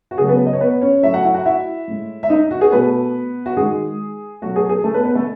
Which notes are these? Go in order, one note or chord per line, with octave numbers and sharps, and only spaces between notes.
F#4
C#3 F#3 A3 G#4
B3 B4
D#5
C#5
B3 B4
C#4 C#5
A2 F#3 A3 E4 E5
F#4 F#5
E4 E5
F#4 F#5
E4 E5
A2 G#3
E5
D#4 D#5
F#4
G#4
B2 A3 B3 B4
F#4
D#3 G#3 G#4
B2 F#3 A3 F#4
G#4
G#4
A3 A4
B3 B4
B3 B4
A3 A4